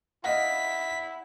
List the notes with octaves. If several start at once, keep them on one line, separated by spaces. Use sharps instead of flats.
E4 D#5 F5 F#5 B6